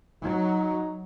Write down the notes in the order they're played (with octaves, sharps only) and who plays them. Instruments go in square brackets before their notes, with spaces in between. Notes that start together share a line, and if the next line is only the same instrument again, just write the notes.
[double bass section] F#3 [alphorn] D#4